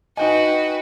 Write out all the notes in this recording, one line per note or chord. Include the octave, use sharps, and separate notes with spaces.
D#4 F#4 B4 D#5 G5 G#5